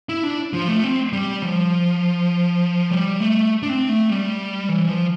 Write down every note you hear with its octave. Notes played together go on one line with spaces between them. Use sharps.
E4
D4
F3
A3
C4
G3
F3
G3
A3
D4
C4
A3
G3
E3
F3